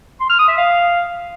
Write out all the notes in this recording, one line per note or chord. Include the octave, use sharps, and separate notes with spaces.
C6
F6
D#6
E5
F5